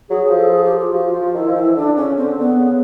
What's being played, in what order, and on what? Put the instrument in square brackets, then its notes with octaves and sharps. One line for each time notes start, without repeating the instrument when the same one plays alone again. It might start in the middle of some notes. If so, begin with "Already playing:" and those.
[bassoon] F#3 [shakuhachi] G#4
[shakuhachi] G#4
[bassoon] F3
[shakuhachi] A4
G#4
G4
F4
[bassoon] F3 [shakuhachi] F#4
[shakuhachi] F4
[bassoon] F3
[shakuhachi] F4
[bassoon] D#3 [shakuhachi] E4
[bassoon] F3
[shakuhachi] E4
[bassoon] E3
[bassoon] D3 [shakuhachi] D4
[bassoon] C#3 [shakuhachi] C#4
[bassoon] D3 [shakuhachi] C4
[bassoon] D3 [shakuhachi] B3
[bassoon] C#3